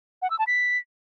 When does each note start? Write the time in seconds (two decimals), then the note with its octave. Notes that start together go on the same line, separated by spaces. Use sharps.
0.22 F#5
0.30 E6
0.39 A5
0.47 B6